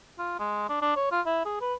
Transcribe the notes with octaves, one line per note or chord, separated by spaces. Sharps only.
F4
G#3
D4
D4
C#5
F4
E4
G#4
B4